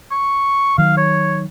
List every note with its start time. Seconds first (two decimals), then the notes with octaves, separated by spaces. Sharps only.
0.11 C#6
0.78 D#3 F#3 F5
0.97 C#5